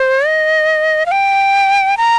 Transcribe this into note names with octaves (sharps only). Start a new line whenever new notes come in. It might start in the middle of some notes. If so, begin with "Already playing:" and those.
Already playing: C5
D#5
F5
G5
A#5